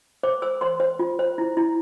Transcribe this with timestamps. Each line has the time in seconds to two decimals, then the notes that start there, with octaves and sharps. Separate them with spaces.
0.23 C5 D6
0.42 C5 E6
0.61 C5 C6
0.80 C5
0.99 F4
1.19 C5
1.38 E4
1.57 E4